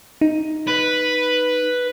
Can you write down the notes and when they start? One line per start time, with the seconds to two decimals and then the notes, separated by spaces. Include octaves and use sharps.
0.21 D#4
0.68 B4